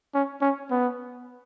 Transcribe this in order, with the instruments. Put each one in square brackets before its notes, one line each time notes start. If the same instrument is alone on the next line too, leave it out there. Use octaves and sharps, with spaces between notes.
[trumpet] C#4
C#4
B3